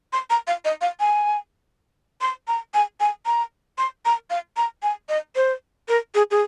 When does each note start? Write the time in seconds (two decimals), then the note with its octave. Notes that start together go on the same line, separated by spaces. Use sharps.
0.13 C6
0.30 A#5
0.47 F5
0.65 D#5
0.81 F5
1.00 G#5
2.21 C6
2.48 A#5
2.74 G#5
3.00 G#5
3.26 A#5
3.78 C6
4.05 A#5
4.30 F5
4.57 A#5
4.83 G#5
5.09 D#5
5.36 C5
5.88 A#4
6.15 G#4
6.31 G#4